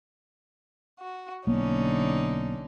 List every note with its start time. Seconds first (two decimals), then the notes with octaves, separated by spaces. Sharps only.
1.00 F#4
1.47 B1 D3 A#3 B3 C#4 D#4